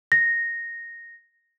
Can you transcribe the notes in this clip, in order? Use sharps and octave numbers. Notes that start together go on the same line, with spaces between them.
A#6